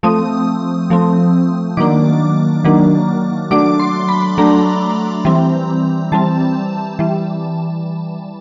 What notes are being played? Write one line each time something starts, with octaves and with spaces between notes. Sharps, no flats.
F3 A3 C4 D#6
F3 A3 C4
D#3 F#3 A#3 D4 D6
D#3 F#3 A#3 D4
F#3 A3 D4 D6
C6
B5
F#3 A3 D4 A#5
E3 G3 C4
E3 G3 C4 A5
E3 G3